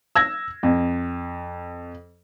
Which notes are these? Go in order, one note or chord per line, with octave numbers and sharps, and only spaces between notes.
E6 G#6 A#6
F2